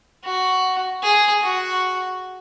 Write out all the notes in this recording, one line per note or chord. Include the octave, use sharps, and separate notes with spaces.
F#4
G#4
F#4